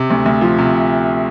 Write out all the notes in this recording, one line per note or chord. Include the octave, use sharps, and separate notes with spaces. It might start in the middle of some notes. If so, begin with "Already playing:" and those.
Already playing: C3
D2
D2
F3
C3